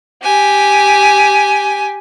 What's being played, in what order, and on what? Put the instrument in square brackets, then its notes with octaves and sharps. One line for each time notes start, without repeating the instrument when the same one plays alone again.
[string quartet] G4 G#5